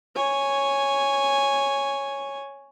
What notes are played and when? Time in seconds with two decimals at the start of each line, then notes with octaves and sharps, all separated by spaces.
0.16 C#5 G#5